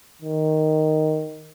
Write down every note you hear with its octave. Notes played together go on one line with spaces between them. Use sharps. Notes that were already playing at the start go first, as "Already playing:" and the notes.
D#3